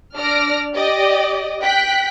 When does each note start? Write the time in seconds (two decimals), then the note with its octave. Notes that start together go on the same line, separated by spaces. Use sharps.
0.16 D4 D5 F6 A#6 D7
0.75 G4 D5 D#5
1.62 G5 F#6 B6